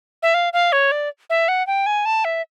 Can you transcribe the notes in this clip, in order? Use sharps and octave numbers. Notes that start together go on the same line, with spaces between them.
E5
F5
F5
C#5
D5
E5
F#5
G5
G#5
A5
E5